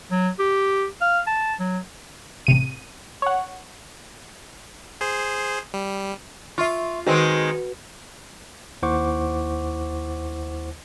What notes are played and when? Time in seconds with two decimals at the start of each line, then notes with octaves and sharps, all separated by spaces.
0.11 F#3
0.39 G4
1.01 F5
1.27 A5
1.60 F#3
2.47 A1 C3 D#7
3.22 C#5 F#5
5.01 G#4 C5
5.74 G3
6.58 F4 E5 C6 C#6
7.07 D#3 G#3 C4 F#4 B4
8.82 D#2 E4 C5 F#5 C#6 D6